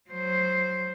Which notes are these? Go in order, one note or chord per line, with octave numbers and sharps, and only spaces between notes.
F#3 C5